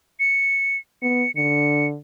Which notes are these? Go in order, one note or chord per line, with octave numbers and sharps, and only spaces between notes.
C#7
B3 C#7
D3 C#7